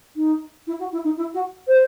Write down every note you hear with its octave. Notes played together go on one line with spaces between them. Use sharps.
D#4
E4
F#4
E4
D#4
E4
F#4
C5